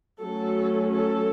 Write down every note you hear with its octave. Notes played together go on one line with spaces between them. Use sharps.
F#3 A3 C#4 A4
A4